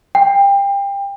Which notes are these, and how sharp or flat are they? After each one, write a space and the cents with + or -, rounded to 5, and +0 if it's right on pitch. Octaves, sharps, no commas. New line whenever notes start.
G5 +25